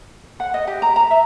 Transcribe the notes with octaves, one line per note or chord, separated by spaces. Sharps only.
F#5
D#5
G4
A#5
A#5
E5